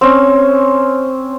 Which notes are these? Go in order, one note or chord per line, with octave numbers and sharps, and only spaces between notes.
C4 C#4